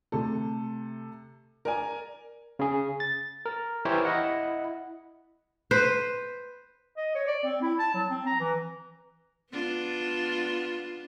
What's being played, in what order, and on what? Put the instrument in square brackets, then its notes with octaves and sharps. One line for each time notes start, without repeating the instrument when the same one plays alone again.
[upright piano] C3 A3 A4
A#4 D5 G#5
[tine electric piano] C#3 G#4
A6
A#4
E3 E4 G4 A#4 C5 C#5
E4 D#5 F#5
[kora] B4 C5
[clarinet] D#5
C#5
D5
C4
E4
A5
F#3
C4
A#5
E3
[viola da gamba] B3 D4 F4